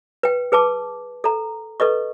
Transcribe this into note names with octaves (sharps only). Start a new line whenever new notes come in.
B4 G5
G#4 B4 A5 D6
A4 A#5
A4 B4 D#5 C#6